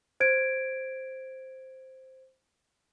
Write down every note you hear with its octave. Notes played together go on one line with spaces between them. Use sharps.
C5 G#6 D7